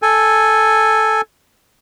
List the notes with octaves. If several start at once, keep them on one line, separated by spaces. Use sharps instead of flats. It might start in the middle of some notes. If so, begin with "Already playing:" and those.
A4 G#5